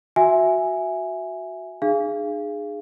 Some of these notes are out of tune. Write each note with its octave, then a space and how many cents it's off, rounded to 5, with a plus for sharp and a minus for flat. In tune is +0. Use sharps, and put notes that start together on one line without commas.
F#4 +0 E5 +0 G#5 +0
D#4 -45 G#4 +0 F5 -30